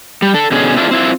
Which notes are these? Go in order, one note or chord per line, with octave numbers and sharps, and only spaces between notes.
G3
D4 A4
B2 D3 C#4 G#4
A3 C4 D4 E4 F4
C4 E4 F4